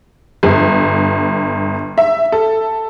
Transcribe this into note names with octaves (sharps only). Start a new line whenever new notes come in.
G1
E5
A4